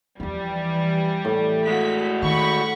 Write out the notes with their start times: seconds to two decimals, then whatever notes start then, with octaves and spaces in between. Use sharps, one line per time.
0.20 E2 E3 F3 G3
1.25 A2
1.68 G#3 F#4 B6
2.22 D#3 F#5 B5 C#6